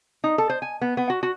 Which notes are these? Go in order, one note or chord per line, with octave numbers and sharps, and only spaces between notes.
D#4
A4
C5
G#5
B3
B3
F#4
F#4